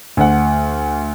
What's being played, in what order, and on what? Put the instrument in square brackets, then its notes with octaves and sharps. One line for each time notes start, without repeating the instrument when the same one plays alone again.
[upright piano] D2 F#5